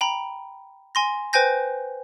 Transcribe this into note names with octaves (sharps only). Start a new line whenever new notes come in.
G5 A#5 B5
G#5 C6 A#6
B4 C5 G5 G#5 G6 A#6